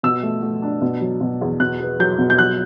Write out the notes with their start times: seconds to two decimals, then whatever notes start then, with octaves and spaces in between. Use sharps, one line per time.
0.03 B2 E6
0.23 A3
0.43 A3
0.62 D4
0.81 B2
1.01 F#3
1.21 B2
1.41 E2
1.60 B2 F#6
1.80 B3
1.99 F#3 G6
2.18 B2
2.30 G6
2.38 F#3 F#6